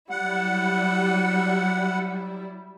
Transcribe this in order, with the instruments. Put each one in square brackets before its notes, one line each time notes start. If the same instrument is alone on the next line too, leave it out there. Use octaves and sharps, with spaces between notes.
[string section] F#3 G3 E4 [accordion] F#5